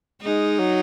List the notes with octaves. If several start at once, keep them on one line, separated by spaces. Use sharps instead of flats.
G#3 D#4
F#3